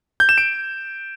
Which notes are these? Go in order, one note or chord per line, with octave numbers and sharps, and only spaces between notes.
G6
E7
D7